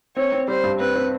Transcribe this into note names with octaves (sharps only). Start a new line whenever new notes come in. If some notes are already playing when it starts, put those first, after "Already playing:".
C4 C#5
C4
G3 C5
G2
C4 B4
C4